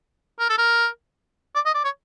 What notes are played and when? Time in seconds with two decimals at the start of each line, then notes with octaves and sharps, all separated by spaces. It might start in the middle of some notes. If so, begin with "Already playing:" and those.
0.40 A#4
0.49 A4
0.58 A#4
1.55 D5
1.66 D#5
1.75 D5
1.84 C#5